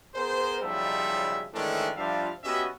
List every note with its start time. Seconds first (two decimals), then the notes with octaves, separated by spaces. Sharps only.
0.15 B3 G#4 A#4 C5
0.62 B1 C#3 F3 G3 D#4 E5
1.53 D#3 E3 G#3 A3 C#4 D4
1.96 F3 G3 D4 F4 E5 F5
2.44 B3 C#4 F#4 G4 D#5 E5